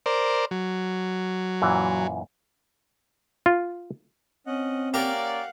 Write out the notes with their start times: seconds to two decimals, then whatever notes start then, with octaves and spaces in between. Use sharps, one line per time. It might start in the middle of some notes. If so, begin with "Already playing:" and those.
0.06 A#4 C5 D5
0.51 F#3
1.62 F#2 A#2 E3
3.46 F4
4.47 C4 C#4 D#5 F#5
4.94 A#3 C#4 G4 A#4 D5 F5 F#5